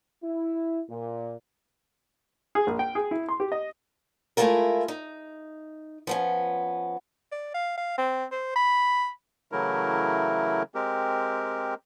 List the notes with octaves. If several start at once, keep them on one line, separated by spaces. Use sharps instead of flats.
E4
A#2
G#4
A#1
G5
G#4
E4
C6
G4
D#5
G#3 A3 C#4 E4 F4 A#4
D#4
F3 B3 C#4
D5
F5
F5
C4
C5
B5
C#3 E3 F#3 A3 E4 A#4
G#3 C4 G4 A#4